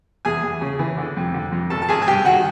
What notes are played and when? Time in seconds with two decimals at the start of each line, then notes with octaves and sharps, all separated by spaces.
0.25 E2 G#4 G#5
0.43 E2
0.61 C#3
0.79 E3
0.97 D3
1.17 F2
1.34 D3
1.52 F2
1.70 G#1 A4 A5
1.82 A5
1.89 G#1 G#4 G#5
2.02 G#5
2.07 G2 G4 G5
2.25 D#3 F#4 F#5